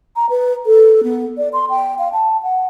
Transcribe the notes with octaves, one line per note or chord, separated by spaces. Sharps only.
A#5
B4
A4
B3
D5
C6
G5
F5
A5
F#5